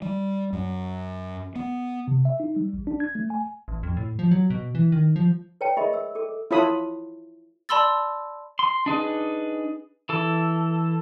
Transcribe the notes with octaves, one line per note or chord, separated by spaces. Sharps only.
G3
F#2
B3
C3
E5
D#4
G3
A1
D4
G#6
A3
G#5
A1
F2
A2
F3
F#3
B2
E3
D#3
F3
B4 C#5 D5 G5 A5
G#4 A#4 D#5 E5 B5 C#6
C5 E6
A4 D6
E4 F4 A4 C#5 B5 D#6
D5 A5 B5 C6 E6 A6
C6
D4 D#4 G#4 B4
E3 A4